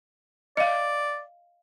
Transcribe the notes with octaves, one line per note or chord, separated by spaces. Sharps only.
D5 D#5 F5